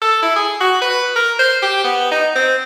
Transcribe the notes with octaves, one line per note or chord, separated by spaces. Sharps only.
A4
E4
G#4
F#4
B4
A#4
C5
G4
B3
D#4
C4